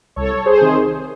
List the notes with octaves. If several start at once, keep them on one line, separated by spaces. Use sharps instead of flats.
C2 A4 C#5
G#4 C5
C3 D#3